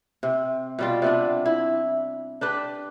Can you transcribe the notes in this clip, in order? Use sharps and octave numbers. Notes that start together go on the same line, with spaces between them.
C3
B2 G3 F4
C3 B3 D4
E4
D4 G4 B4